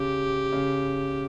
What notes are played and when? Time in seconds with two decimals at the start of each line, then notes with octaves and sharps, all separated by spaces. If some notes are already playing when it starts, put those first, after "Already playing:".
Already playing: C#3 G4
0.52 C#3